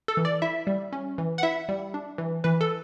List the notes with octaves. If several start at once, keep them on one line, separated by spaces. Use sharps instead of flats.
A4
E3
D5
E4 E5
G3
C#4
E3
F#5
E4 E5
G3
D4
E3
E3 B4
A4